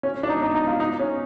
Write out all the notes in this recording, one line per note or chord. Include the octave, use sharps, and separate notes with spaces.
C#4
D4
D#4
D#4
D#4
F4
D#4
C#4